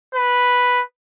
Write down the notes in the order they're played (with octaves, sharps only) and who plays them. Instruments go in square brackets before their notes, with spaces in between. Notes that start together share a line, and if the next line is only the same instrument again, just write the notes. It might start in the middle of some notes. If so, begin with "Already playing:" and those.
[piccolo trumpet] B4